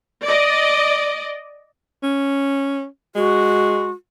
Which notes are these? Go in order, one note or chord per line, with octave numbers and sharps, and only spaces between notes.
D5 D#5
C#4
G#3 F#4